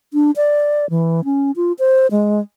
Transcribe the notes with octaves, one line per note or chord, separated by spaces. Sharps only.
D4
D5
E3
C#4
F4
C5
G#3